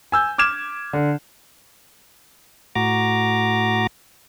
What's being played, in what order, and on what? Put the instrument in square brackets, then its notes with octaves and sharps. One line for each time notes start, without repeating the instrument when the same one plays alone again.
[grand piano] G#5 E6 G6
D6 F6 G#6 E7
D3
[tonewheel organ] A2 F#4 A#5 D6